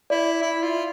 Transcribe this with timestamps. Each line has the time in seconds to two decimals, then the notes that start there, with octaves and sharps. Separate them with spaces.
0.10 E4 D5
0.42 E4
0.63 F4